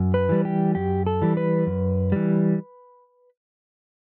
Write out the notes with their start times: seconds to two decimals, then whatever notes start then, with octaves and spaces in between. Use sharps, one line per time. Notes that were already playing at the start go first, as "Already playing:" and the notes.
Already playing: F#2
0.14 B4
0.29 E3 G3
0.45 G4
0.75 F#2 G4
1.06 A4
1.22 E3 G3
1.37 B4
1.67 F#2
2.12 E3 G3